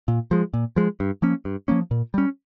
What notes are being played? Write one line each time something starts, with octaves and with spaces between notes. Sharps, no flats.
A#2
F3 G#3
A#2
F3 G#3
G2
F3 A#3 C#4
G2
F3 A#3 C#4
A#2
G3 C#4